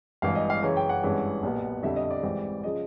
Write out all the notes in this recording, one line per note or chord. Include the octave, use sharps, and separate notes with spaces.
G#1 G2 E3 F5
D#5
F5
F#2 C#3 E3 G#3 C#4
G5
F#5
G#1 G2 E3 G#3 C#4
B1 A#2 G3 B3
F2 D3 G3 E5
D#5
D5
G#1 G#2 E3 G3 C4
C#3 F3 G#3 D#5